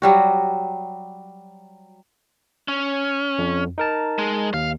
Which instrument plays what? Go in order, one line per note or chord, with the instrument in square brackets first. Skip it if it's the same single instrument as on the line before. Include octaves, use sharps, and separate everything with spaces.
[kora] F#3 G3 F#4
[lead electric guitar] C#4
[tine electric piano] F2
D#4 A#4 A5
[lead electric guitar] G#3
[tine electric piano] D#2 [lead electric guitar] F5